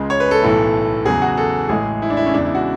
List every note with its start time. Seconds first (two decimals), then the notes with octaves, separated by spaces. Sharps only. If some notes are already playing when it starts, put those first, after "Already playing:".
Already playing: C#2 C#3 G#3
0.10 C#5
0.20 B4
0.31 A4
0.41 B1 A2 E3 A3
1.06 E2 C#3 F#3 G#4
1.22 F#4
1.37 A4
1.69 A1 A2 G#3 G#4
2.02 E4
2.10 D4
2.17 E4
2.26 C#4
2.34 E2 C#3 G#3 D4
2.45 E4
2.55 F#4